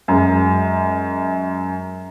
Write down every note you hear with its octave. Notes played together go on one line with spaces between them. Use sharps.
F#2 G#3